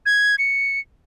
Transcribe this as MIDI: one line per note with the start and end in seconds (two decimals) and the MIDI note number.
0.06 0.36 92
0.39 0.79 97